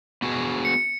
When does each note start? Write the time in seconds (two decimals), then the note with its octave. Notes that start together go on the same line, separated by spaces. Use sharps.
0.22 B3 F#4 G#4
0.65 C#7